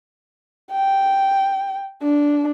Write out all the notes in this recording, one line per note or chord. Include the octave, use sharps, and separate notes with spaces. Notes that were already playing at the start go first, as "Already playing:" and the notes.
G5
D4